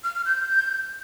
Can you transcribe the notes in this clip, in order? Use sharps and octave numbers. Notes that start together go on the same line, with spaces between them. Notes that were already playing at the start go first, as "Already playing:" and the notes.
F6
F6
G6